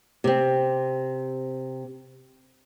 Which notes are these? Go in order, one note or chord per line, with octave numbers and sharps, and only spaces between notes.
C3 C4